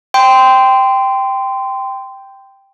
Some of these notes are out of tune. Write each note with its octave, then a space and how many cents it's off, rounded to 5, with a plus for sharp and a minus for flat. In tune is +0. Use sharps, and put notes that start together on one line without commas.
G5 +0 C6 -20